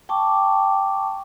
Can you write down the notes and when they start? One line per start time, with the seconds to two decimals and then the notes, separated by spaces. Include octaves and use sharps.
0.09 G5 A5 C#6 D6